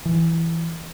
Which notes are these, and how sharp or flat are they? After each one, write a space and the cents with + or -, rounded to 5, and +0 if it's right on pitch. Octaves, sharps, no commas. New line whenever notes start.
E3 +5